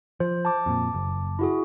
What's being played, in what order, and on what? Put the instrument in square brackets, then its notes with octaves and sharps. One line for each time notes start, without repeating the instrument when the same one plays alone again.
[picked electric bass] F3 [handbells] C5
[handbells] A5 D6
[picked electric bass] F2 A#2
F#1
[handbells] E4 F#4 G#4